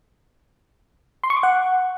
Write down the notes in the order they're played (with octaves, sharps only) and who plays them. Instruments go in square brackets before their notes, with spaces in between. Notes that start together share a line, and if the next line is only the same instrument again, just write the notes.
[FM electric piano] C6
C#6
D6
F#5